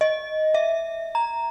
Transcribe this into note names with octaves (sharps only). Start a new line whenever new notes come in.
D#5
E5
A#5